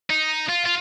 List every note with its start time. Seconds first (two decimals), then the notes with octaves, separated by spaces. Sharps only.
0.10 D#4
0.49 F4
0.66 F4